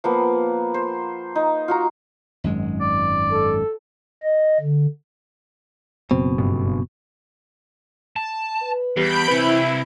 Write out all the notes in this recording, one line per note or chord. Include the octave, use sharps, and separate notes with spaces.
F3 A#3 B3
C5
D#4
F4 F#4 A#5
G#1 F#2 G#3
D5
A4
D#5
D3
F#1 B2 C4
G1 G2 B3
A5
B4
E2 G3 B5 G6 D7
C3 E3 C4 E4 B4 B5